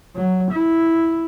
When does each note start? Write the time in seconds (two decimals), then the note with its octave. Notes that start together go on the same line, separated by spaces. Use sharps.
0.15 F#3
0.52 E4